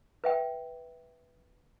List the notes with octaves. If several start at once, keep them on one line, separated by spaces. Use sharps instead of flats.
B4 E5 G5